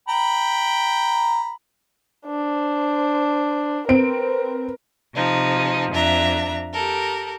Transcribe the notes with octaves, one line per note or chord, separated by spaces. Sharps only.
G5 A#5 B5
D4 C5
C4 A#4 B4 D7
C3 F3 D#4
F2 D4 E5 A#5
G4 A4 A#4